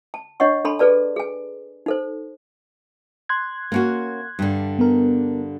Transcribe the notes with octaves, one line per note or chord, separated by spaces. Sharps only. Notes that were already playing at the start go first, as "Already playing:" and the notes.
A5
D4 C#5 D#5 F#5 C#6
D4 A4 A5 B5 C6
G#4 A4 B4 D5 A5
G#4 G#5
D#4 A4 C5
C6 F#6 G#6
A#3 C#4 F#4
G2 D3
B3 A#4